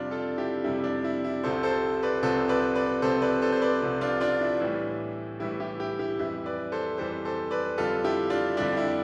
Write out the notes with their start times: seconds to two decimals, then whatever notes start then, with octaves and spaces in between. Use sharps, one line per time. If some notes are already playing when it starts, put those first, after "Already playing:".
Already playing: F2 C3 G3 D4 F4
0.11 F4 A4
0.38 E4 G4
0.64 F2 C3 G3 E4
0.84 D4
1.04 E4
1.24 E4
1.43 C2 C3 F3 A4 C5
1.63 A4 C5
2.03 B4 D5
2.23 C2 C3 F3 A4 C5
2.49 B4 D5
2.75 B4 D5
3.02 C2 C3 F3 A4 C5
3.22 B4 D5
3.42 A4 C5
3.52 C5
3.61 B4 D5
3.82 C2 C3 F3
4.01 D4 F4
4.21 D4 F4
4.41 E4
4.61 A2 E3 G3
5.40 A2 E3 G3 E4
5.60 E4 G4
5.79 E4 G4
5.99 E4 G4
6.19 F2 E3 G3 E4
6.46 B4 D5
6.72 A4 C5
6.98 F2 E3 G3 A4 C5
7.25 A4 C5
7.51 B4 D5
7.78 F2 D3 G3 F4 A4
8.04 E4 G4
8.30 D4 F4
8.57 F2 D3 G3 D4
8.77 E4